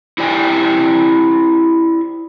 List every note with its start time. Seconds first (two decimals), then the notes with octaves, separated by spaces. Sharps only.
0.18 E4 G4 C5 D5 G5 G#5